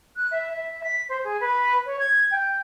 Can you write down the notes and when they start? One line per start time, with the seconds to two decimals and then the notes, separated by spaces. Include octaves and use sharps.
0.16 F#6
0.31 E5
0.53 E5
0.84 B6
1.09 C5
1.24 G#4
1.40 B4
1.86 C#5
2.00 G#6
2.31 G5